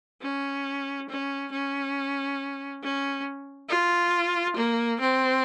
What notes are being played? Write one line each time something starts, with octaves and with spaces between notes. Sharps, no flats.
C#4
C#4
C#4
C#4
F4
A#3
C4